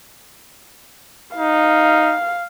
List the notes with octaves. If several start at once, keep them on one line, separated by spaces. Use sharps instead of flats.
D#4 F5